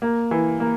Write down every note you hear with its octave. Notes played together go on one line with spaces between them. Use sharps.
A#3
E3
A#3